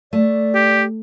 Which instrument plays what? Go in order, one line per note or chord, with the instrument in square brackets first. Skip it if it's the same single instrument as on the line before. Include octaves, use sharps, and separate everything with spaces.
[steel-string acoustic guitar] A3 [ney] D5
[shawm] G4